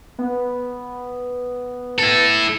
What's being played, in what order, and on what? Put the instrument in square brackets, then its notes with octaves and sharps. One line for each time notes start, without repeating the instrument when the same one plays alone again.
[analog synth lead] B3
[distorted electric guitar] E4 A4